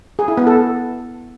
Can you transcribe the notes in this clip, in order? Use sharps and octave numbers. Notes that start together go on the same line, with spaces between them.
G#4
E4
B3
A4